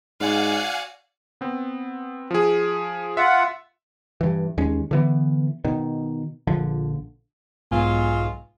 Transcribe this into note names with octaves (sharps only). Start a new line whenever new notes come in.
G#2 F#4 D5 F5 F#5 G#5
B3 C4
F3 G#4
F4 E5 F#5
G2 E3
D#2 G#3 C#4
D3 E3 B3
B2 D#3
A#1 D3 F3
B1 G#2 F#3 G#3 B3 F4 G#5